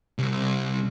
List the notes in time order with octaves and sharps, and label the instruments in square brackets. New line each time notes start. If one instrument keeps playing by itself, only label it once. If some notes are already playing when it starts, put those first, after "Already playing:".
[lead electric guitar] C2